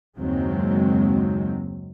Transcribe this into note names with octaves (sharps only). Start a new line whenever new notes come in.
F#1 D#2 D#3 F#3 G#3 C4